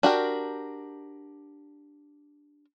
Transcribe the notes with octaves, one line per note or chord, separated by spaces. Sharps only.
D4 F#4 G4 A#4